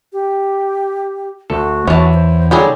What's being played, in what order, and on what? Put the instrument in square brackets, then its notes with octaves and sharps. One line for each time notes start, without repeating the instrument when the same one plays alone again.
[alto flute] G4
[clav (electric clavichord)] D2 A4 [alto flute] F#4
[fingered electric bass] E2 [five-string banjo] E3 A5 [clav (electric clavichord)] C#5
[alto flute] C5
[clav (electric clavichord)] D3 [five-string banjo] F#3 G3 G#4 [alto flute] D#4